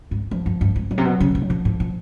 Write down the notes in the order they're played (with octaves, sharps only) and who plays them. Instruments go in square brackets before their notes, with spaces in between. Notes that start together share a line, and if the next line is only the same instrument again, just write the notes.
[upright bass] G#2
[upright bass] G2 [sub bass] F3
[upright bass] F#2
G2
G#2
[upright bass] A2 [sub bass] F#3
[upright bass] C3
B2
C#3
C3
[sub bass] F#3
[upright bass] A#2 [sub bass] F3
[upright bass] A2
A#2